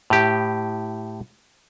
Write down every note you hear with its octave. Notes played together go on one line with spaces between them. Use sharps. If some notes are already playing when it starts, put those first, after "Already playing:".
A2 G4